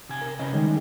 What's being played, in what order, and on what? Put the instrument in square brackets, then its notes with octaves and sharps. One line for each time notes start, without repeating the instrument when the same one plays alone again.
[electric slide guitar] C3 G#5
[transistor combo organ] A#4
[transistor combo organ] C#3 [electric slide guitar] E4 B4 D#5
[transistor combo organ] D#3 G#3 [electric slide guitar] G3